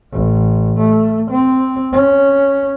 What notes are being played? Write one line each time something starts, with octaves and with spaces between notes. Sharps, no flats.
A1
A3
C4
C#4